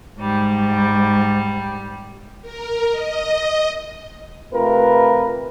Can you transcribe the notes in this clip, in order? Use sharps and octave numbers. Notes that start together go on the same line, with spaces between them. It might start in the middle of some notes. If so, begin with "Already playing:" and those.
G#2 G3
A#4
D#5
C3 A3 F4 G4 A#4 B4